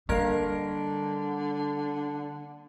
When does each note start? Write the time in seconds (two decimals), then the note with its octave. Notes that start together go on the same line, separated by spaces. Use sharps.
0.09 D3 G3 A#3 A#4 F5 G#6 D7